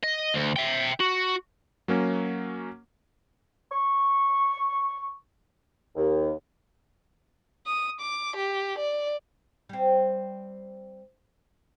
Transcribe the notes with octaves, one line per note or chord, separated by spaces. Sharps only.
D#5
D2
E5 G5
F#4
F#3 A#3 C#4
C#6
D#2
D#6
D6
G4
D5
G3 C4